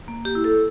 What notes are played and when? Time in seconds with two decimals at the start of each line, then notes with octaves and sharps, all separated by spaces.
0.08 A#3
0.25 G4
0.35 E4
0.44 A4